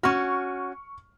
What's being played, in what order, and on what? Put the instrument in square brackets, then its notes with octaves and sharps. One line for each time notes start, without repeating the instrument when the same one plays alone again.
[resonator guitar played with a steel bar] C#4 F#4 [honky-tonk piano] C#6 F6